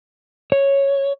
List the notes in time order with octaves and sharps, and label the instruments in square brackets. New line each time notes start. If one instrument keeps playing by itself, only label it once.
[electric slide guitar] C#5